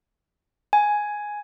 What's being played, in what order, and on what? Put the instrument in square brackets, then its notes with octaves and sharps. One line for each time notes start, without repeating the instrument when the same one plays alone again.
[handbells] G#5